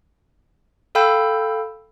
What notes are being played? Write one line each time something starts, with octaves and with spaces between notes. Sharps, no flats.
A4 F5 G5 B5 E6 G6